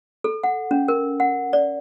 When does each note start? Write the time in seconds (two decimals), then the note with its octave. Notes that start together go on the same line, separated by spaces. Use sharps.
0.24 A4
0.43 F#5
0.71 C#4
0.88 A#4
1.20 F#5
1.53 D5